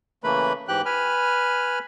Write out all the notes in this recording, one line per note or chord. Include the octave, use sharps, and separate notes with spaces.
C#3 E3 A3 A#3 B4 B5
G#2 E3 G4 G5 F#6
B4 G#5 B5 F6